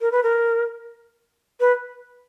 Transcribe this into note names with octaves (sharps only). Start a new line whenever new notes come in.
A#4
B4
A#4
B4